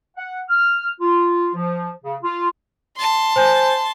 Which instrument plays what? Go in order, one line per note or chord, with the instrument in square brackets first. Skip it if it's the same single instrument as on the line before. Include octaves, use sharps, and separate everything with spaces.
[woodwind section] F#5
F6
F4
F3
C#3
F4
[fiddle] A5 C6
[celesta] C5 G#5 G6